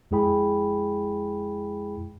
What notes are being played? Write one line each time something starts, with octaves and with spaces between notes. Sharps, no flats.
F2 G#3 E4 G#4 G5 B5